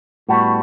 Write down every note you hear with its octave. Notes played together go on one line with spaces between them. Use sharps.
A2 G3 B3 F#4